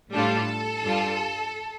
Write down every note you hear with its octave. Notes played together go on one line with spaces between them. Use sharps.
A2 G3 D4 F4 A4
G2 G3 F4